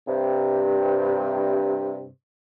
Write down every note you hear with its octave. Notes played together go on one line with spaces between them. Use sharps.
G2 C3